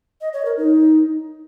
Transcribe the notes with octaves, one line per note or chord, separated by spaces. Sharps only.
D#5
C#5
A#4
D#4